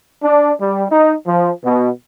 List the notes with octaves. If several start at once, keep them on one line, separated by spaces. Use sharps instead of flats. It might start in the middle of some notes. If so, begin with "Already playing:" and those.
D4
G3
D#4
F3
B2